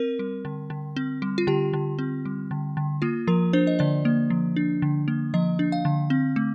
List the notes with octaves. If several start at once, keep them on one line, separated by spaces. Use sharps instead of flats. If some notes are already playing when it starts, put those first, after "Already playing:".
Already playing: C4 A#4
G3
D3
D3
C4
G3
F4
D3 G4
D3
C4
G3
D3
D3
A#3 F4
F3 A#4
D4 C5
D#5
D3 D5
A#3
F3
D4
D3
A#3
F3 D#5
D4
F5
D3
C4
A3